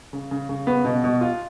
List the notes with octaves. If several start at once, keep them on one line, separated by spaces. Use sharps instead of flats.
C#3
C#3
C#3
B3
B2
B2
F4